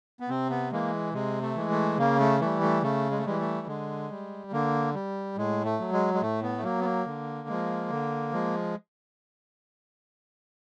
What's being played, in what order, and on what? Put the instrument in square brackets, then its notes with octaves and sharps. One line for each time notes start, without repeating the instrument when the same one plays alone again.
[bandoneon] B3
C3 C4
B3
E3 G#3 A#3
C3 G#3
A3
E3 G#3
A3
C#3 A#3
A3
E3 G3 A3
A3
C#3 A3
G#3
A3
E3 G3 G#3
A3
D3 G#3
G3
D3 A#3
G3
A2 G#3
A3
F#3
G#3
G#3
A2 A3
B3
A3
F#3 A#3
B3
A#3
D3
F3 G#3
D3
F3 G#3